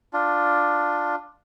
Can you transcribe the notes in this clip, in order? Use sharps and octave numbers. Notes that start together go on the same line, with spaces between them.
D4 F4